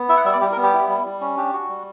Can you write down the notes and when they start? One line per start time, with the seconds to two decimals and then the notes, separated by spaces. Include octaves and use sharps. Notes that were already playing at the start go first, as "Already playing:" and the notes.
Already playing: B3
0.09 E4 E5
0.17 F#5
0.25 G3 E5
0.33 D5
0.41 G3 G4
0.52 A#4
0.57 B3
0.63 G4
0.73 E4
0.89 G3
1.05 G3
1.21 C#4
1.37 D4 G4
1.53 F#4
1.69 G3